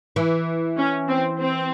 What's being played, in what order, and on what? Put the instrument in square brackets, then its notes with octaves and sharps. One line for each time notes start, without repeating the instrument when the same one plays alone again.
[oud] E3
[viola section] C#4
C4
C4